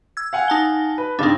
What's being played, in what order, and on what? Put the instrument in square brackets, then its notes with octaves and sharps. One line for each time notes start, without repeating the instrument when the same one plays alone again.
[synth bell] E6 G#6
[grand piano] F5 F#5 G#5
[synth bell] D#4 A5 G7
[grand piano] B4
[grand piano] G2 C#3 C4 [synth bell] D4 D#4